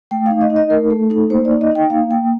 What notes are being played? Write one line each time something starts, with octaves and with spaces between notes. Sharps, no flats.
A3 G5
F5
D#4
D#5
D#4
D#5
A3 A#4
A3 A4
D#4 A4
A#3 C5
D5
D#4
D#5
D#4 G5
A#3 F5
A#3 G5